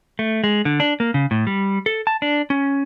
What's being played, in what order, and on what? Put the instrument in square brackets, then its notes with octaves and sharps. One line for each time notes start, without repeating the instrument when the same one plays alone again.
[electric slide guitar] A3
G#3
D3
D4
A#3
C#3
A2
G3
A4
A5
D4
C#4